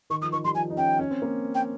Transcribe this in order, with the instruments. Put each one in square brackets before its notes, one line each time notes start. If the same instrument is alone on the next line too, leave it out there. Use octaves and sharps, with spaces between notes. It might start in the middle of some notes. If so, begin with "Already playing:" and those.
[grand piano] D#3 [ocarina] C#6
[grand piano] F3 [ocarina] D#6
[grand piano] D#3 [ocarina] C#6
[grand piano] G3 [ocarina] C6
[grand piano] F3 [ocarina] G#5
[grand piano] D#4
[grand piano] C#4 [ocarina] G5
[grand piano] C#4
C4
A#3
[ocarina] G5